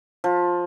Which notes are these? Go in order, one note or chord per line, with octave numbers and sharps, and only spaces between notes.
F3